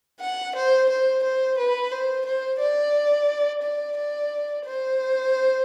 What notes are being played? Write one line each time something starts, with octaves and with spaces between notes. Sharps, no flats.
F#5
C5
C5
C5
B4
C5
C5
D5
D5
D5
C5